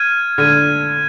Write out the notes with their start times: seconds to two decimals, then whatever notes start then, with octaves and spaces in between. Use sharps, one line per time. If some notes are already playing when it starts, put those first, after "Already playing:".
Already playing: F6 G#6 D#7
0.38 D3 F6 G#6 D#7